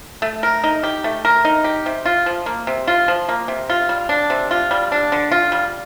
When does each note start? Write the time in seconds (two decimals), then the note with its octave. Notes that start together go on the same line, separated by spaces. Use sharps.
0.22 A3
0.43 A#4
0.64 D#4
0.83 G4
1.04 A3
1.25 A#4
1.45 D#4
1.64 G4
1.86 C3
2.06 F4
2.26 F3
2.46 A#3
2.67 C3
2.88 F4
3.08 F3
3.29 A#3
3.48 C3
3.70 F4
3.89 G3
4.09 D4
4.30 C3
4.51 F4
4.71 G3
4.92 D4
5.12 D3
5.31 F4
5.52 G3